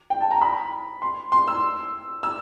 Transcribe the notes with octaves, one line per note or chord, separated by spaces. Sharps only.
G5
A5
A#5
B5
C6
C6
E6
E6